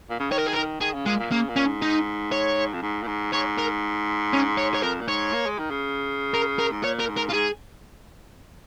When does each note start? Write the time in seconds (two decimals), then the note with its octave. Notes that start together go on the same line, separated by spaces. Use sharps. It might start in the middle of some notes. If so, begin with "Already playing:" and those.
0.10 A#2
0.19 C#3
0.31 D#3 C#5
0.39 A#4
0.47 G#4
0.53 D#3 A#4
0.81 D#3 G#4
0.94 C#3
1.06 A#2 G#3
1.19 A#2
1.31 C#3 A#3
1.49 A#2
1.56 C#4
1.65 G#2
1.82 D#4
2.32 C#5
2.73 F2
2.82 G#2
3.03 A#2
3.07 G#2
3.32 G#2 C#5
3.58 A#4
4.33 C#4
4.58 C#5
4.74 C#5
4.83 F2 A#4
5.01 A#2
5.08 G#2 C#5
5.33 A#3
5.46 G#3
5.59 D#3
5.71 C#3
6.34 A#4
6.59 A#4
6.72 G#2
6.84 A#2 C#5
7.00 A#4
7.08 G#2
7.17 A#4
7.30 F4
7.34 G#2 G#4